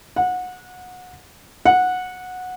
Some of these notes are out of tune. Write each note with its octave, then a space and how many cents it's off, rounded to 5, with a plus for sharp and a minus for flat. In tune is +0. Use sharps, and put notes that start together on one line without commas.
F#5 -25
F#5 -15